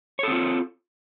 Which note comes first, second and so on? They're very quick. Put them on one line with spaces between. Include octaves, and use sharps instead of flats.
C#5 A4 C4 F4